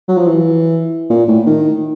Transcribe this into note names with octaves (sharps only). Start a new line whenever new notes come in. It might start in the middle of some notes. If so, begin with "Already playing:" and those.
F#3
F3
E3
A#2
A2
D#3